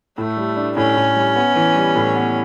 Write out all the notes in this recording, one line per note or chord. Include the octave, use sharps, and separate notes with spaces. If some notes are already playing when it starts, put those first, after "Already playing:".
A2 A3
G3
D4
A2 C#4
A2
G3
B3
E3
G3
A2
B3